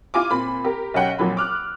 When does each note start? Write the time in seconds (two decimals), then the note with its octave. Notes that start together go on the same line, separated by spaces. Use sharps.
0.14 E4 F4 G#5 D6
0.31 A#2 C4 B5
0.64 G4 A#4
0.94 B1 C#4 F#5 G5
1.19 F2 A#2 F#3 B5
1.37 D6 F6 F#6